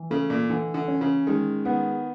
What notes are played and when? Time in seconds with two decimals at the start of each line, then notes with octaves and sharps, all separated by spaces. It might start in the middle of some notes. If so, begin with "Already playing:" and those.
Already playing: E3
0.10 C#3 A3
0.30 A#2
0.49 D3 E3
0.74 D3
0.88 C#4
1.01 C#3
1.27 D#3 G#3
1.65 D#3 B3